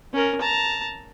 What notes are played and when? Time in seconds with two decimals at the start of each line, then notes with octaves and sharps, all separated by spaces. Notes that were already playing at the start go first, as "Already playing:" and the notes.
0.13 C#4 A#4
0.41 A5 A#5